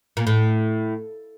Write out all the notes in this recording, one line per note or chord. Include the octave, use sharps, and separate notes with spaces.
A#2
A2